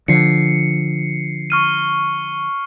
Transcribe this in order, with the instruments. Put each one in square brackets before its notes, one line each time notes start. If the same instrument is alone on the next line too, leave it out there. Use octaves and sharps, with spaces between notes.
[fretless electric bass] D3 F3 [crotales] C7 C#7
[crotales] C#6 F6 D#7